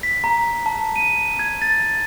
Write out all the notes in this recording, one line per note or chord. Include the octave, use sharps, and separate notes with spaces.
B6
A#5
A5
D#7
G#6
A6